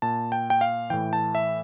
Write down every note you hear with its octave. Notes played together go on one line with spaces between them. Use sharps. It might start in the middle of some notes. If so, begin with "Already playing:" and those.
A#2 A5
G5
G5
F5
A2 E3 G5
A5
E5